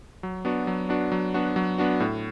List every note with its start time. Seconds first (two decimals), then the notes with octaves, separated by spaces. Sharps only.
0.23 F#3
0.45 B3 D4 F#4
0.67 F#3
0.89 B3 D4 F#4
1.12 F#3
1.34 B3 D4 F#4
1.56 F#3
1.78 B3 D4 F#4
2.00 A2